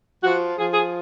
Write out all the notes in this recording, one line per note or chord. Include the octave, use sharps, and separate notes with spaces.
F3 F#4
F3 G#4
G#4